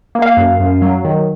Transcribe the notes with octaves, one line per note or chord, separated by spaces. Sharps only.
A#3
F5
F#2
F#2
F#3
D#3